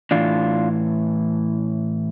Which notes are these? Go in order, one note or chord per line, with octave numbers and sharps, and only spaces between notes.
A2 E3 D4 F4